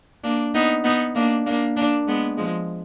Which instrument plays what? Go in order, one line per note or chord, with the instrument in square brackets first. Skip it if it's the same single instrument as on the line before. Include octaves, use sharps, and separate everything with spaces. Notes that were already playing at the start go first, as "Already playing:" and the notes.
[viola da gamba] A#3 D4
B3 D#4
B3 D#4
A#3 D4
A#3 D4
A#3 D4
G#3 B3
F3 G#3